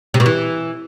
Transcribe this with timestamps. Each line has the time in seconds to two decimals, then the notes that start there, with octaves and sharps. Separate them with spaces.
0.14 C3
0.20 B2
0.26 E3